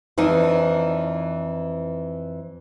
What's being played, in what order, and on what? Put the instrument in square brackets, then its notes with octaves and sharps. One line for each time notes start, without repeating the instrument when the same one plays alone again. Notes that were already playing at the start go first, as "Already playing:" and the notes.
[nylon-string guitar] F2 E3 D4 D#4